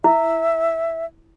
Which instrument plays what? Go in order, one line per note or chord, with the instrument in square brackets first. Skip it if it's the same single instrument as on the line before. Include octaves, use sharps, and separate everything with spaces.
[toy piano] E4 [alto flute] E5